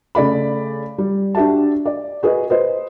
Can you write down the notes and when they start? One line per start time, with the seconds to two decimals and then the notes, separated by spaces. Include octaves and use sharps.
0.15 C#3 A3 D5 B5
0.98 G3
1.35 D4 F#4 G4 E5 A5
1.85 D5
2.23 F#4 G#4 B4 D#5
2.50 B4 C5 D#5